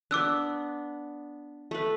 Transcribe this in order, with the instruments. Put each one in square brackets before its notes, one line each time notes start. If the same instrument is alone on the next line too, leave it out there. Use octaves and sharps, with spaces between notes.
[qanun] B3 D4 [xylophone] D6 E6 F#6
[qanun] A3 B4